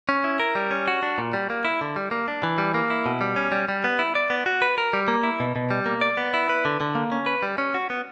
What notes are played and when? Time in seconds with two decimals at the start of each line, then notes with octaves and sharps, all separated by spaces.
0.09 C#4
0.24 E4
0.40 A#4
0.55 G3
0.71 C#4
0.88 F#4
1.03 D4
1.18 A#2
1.33 G3
1.50 A#3
1.65 E4
1.81 D3
1.96 G3
2.11 A#3
2.28 D4
2.43 E3
2.58 G3
2.74 A#3
2.90 E4
3.06 B2
3.21 G3
3.36 C#4
3.52 G3
3.69 G3
3.84 B3
3.99 E4
4.15 D5
4.30 B3
4.46 F#4
4.62 B4
4.78 A#4
4.93 G3
5.08 A#3
5.23 E4
5.40 B2
5.56 B2
5.71 G3
5.86 A#3
6.01 D5
6.17 B3
6.34 E4
6.49 B4
6.65 D3
6.81 D3
6.95 A#3
7.12 C#4
7.26 B4
7.43 G3
7.58 C#4
7.74 F#4
7.90 B3